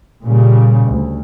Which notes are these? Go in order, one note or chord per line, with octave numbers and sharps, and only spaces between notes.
A#2 C#3 G3
D2